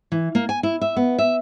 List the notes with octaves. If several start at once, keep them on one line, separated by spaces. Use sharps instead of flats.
E3
A#3
G#5
E4
E5
B3
E5